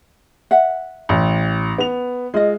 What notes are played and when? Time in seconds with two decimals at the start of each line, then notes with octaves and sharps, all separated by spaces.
0.51 E5 F#5
1.09 A1
1.78 B3 F7
2.34 G#3 F4 D#5